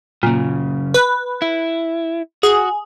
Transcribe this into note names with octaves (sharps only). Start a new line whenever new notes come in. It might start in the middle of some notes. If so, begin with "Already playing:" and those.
F#2 A#2 C#3
B4
E4
F#4 G#4